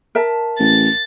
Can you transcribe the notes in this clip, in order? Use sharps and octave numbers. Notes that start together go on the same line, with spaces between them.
A#4 E5 A5
A1 A6